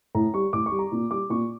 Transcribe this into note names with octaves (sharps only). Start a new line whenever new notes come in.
A2 A#5
G3 C#6
A2 D6
C#6
G3
A#5
A#2
G3 D6
A#2 C#6